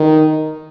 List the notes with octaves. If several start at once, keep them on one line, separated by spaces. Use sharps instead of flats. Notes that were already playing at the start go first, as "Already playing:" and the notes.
Already playing: D#3